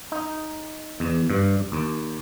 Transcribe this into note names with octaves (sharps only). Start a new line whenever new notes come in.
D#4
E2
G2
D#2